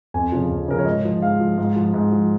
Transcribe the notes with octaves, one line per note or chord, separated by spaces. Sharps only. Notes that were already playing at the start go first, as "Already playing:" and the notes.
F2 G#5
C#3 F3
F2
C#3 F3 A#4
C#5
G#2 D#5
F3
G#2 F5
F3
G#2
F3
G#2
F3